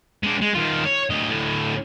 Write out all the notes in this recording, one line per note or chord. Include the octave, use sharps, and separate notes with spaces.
G#3 D4
G#3
D#3 F4
C#5
D2 D#5
D2 A2